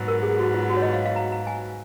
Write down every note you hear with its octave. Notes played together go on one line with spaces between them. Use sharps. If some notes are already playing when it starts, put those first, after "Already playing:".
Already playing: G#2 F#3 B3
A#4
G#4
F#4
F4
F#4
C#5
D#5
F5
F5
A#5
A#5
G#5